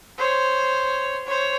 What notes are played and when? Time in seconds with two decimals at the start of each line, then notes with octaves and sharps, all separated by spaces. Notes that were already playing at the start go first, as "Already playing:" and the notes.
0.18 C5 C#5
1.26 C5 C#5